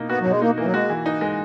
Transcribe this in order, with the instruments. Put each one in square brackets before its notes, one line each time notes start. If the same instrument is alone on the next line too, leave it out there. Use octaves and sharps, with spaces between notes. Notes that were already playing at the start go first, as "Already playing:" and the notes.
Already playing: [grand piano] B2 A#3 D#4
[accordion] B3 [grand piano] F#4
[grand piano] B2 [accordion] F#3
[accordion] G#3
[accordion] A#3 [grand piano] D#4
[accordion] E3 [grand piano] A#3
[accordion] F#3
[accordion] G#3 [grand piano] F#4
[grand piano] E3
D#4
G#3